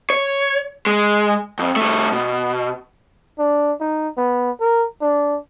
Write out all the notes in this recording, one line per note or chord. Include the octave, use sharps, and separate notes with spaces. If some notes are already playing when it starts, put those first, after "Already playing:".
C#5
G#3
F2
C2 A3
B2
D4
D#4
B3
A#4
D4